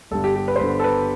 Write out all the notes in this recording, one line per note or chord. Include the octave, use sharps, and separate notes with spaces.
G1 G2 D3 A4
G4
G4
B4
C5
G1 G2 D3 B4
A4
B4